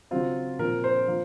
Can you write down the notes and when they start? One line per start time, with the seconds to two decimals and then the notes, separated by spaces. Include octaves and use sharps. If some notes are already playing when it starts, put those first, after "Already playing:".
0.11 C#3 F#3 C4 F4
0.59 A#2 F3 C4 A#4
0.84 C5
1.08 F3 A#3